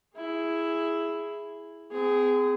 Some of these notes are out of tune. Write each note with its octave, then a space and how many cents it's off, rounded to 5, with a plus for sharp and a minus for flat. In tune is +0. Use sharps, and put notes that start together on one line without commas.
E4 +5 G#4 +0
C4 -40 G#4 +0